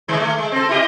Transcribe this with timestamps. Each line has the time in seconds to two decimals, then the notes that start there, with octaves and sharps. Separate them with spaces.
0.08 A2 D#3 G#3
0.20 A3
0.38 G#3
0.52 C4 A4
0.69 E4 G4 D#5